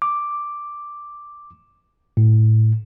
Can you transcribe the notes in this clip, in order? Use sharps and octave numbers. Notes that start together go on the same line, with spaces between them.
D6
A2